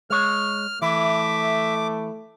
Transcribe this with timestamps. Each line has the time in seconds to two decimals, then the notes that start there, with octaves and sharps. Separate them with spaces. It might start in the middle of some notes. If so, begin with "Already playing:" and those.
0.10 G#3 C#5 F6
0.82 E3 A3 E5 D6